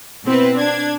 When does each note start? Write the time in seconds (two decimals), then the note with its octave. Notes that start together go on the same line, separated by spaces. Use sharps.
0.25 B2 C4 E4 B4
0.56 D4 G#6